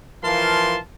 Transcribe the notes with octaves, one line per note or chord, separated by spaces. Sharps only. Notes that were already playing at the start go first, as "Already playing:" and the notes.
E3 F3 A#4 F5 A5 C6